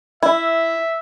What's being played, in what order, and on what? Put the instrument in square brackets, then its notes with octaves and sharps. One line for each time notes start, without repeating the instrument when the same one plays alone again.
[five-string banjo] E4 [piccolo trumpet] E5